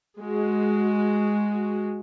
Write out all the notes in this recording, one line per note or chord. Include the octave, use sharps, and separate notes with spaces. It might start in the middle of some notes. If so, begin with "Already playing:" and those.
G#3 F#4